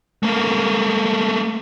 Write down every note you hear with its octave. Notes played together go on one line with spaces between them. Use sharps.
A3 A#3